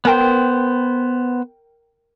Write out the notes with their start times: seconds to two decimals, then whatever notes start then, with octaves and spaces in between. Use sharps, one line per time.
0.05 B3 A#4 C5 G5